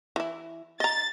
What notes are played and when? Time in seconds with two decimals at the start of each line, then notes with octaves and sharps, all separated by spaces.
0.16 E3 E4
0.80 D#5 A#5 A6